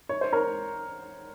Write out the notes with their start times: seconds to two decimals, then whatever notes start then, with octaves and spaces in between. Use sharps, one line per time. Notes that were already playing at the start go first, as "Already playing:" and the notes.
0.09 C#5
0.21 C5
0.32 A#4 C#5